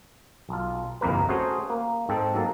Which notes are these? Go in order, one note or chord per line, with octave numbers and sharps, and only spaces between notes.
B1 F4
G1 C2 F2 A#3 A#4 B4
A3 C#4 F#4 G#4 C5
A#3
G#2 C4 A4
F#3 A#3 A4